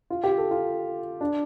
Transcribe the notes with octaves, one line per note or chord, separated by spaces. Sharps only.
F4
G4
A4
F4
D4